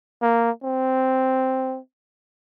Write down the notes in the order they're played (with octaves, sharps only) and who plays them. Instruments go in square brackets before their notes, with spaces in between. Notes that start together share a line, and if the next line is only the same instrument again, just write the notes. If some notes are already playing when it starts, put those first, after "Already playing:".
[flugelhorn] A#3
C4